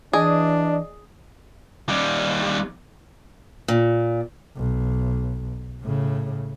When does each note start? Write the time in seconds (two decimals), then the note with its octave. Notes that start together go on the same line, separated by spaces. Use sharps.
0.13 E3 D4 G#4 D5 D#5
1.88 D#2 G3
3.68 A#2
4.57 B1
5.83 A2 C#3